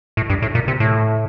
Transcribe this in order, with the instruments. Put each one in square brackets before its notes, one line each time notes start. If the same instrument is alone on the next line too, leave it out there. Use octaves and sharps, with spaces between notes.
[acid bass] A2
G2
A2
A#2
C3
A2